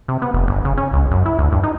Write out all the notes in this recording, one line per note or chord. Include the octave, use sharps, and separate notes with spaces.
C3
B3
F1
G1
C#3
C#4
C#2
F#2
E4
D2
G2
D#4